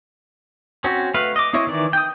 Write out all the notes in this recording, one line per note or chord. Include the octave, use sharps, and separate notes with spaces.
C4 C#4 F#4
A3 B4 F5
D#5 D6
C4 E4 C#5 D#5
D#3 E3 D5
G5 D#6